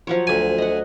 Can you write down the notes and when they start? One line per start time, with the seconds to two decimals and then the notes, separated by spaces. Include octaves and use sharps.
0.07 F3 F#3 C#5
0.27 D2 G#5
0.58 D#5 F#5